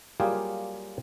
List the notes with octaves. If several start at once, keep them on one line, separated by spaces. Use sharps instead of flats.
F#3 G3 A#3 F4 G4 G#4